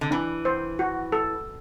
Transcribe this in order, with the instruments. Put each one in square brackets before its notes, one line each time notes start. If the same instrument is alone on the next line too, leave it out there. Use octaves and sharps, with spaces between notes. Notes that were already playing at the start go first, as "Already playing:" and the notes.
[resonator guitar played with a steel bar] D3
[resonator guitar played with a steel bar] E3 [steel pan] D4
[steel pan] C5
F#4
A4